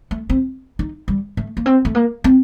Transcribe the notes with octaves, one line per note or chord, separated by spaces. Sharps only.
A3
C4
D#4
G3
A3
A#3
C4
A3
A#3
C4